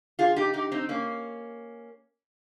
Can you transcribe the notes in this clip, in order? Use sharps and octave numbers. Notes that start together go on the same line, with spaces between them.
F4 G#4
D#4 G4
D#4 G4
C4 D#4
A#3 C#4